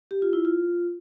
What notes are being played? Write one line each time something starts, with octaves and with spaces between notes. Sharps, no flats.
G4
F4
E4
F4